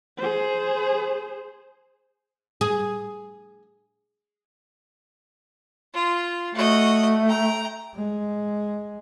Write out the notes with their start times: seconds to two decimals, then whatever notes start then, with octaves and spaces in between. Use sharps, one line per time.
0.18 G#4 C5
2.61 G#4
5.94 F4
6.55 A3 F#4 D#5
7.27 G5 A#5
7.95 G#3